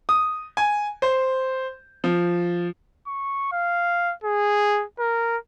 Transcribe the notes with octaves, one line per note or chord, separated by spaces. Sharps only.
D#6
G#5
C5
F3
C#6
F5
G#4
A#4